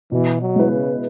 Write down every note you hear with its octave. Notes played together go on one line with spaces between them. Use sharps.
B2 E3
F#3
G#3 E4 B4
C#3